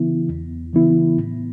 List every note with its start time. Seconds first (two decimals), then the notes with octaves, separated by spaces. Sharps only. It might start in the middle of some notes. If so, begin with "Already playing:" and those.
Already playing: C#3 E3 B3 E4
0.29 E2
0.73 C#3 E3 B3 E4
1.17 A2